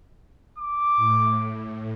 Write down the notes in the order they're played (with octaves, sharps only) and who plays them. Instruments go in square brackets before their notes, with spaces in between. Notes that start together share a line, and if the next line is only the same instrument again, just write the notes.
[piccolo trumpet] D6
[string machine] A2